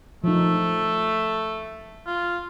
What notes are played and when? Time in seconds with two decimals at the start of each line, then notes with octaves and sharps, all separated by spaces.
0.24 F3 A3 D#4
2.06 F4